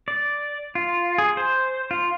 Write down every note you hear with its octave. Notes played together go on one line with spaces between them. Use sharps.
D5
F4
G#4
C5
F4